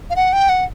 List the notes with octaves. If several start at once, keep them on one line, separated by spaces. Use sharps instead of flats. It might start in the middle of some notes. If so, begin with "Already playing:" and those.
F5
F#5
G5
F#5